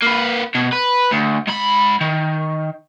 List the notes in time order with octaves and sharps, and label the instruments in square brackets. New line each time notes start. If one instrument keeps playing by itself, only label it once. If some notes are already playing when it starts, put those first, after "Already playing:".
[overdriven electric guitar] A#3 B4
B2
B4
D2
G#2 B5
D#3